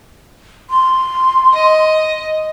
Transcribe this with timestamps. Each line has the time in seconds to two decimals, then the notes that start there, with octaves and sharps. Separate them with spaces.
0.70 C6
1.53 D#5